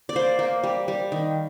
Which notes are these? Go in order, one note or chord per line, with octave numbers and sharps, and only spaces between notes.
D5
A#3 C5
A#3
G3
G3
D#3